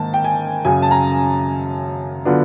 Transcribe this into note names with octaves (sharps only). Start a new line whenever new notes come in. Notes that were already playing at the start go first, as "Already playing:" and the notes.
Already playing: G#2 D#3 A#3 A5
G5
G#5
F#2 C#3 F#3 G#5
A5
A#5
D3 F#3 B3 D4 F4